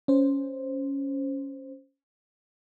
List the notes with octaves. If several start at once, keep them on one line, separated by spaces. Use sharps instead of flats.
C#4 C5